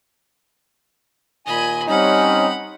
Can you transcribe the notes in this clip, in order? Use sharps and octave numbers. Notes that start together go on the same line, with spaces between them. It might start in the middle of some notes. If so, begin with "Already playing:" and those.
D#2 A#2 D#5 G#5 B5
G3 C4 C#4 D#4 F#5 B5